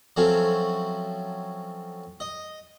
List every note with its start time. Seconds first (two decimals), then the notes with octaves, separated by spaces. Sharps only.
0.16 F3 F#3 A3 C4 C#4
2.20 D#5